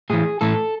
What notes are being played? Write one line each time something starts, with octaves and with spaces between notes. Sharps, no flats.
A2 E3 G#4
A2 E3 A4